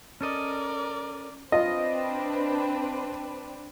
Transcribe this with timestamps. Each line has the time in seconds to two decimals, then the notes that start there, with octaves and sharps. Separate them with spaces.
0.21 C#4 A4 A#4 D5 D#5
1.52 C4 D4 F4 B4 D#5